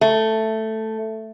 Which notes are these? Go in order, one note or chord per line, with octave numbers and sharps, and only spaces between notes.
A3